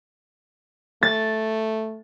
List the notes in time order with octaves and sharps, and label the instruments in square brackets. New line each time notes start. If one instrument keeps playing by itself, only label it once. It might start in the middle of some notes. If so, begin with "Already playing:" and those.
[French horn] A3 [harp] A6